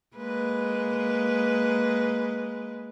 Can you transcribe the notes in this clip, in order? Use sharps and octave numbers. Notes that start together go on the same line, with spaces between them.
G#3 A#3 B4